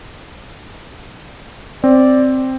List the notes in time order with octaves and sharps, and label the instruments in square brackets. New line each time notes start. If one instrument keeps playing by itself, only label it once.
[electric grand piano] C4 [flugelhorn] D5